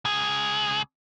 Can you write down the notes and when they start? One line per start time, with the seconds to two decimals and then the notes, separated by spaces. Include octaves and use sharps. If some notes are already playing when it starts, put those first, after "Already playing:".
0.05 C#2 G#4